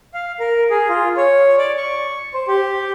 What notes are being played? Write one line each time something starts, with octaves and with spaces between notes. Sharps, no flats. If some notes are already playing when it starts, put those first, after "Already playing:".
F5
A#4
G#4
F4
C#5
D5
C#6
C5
G4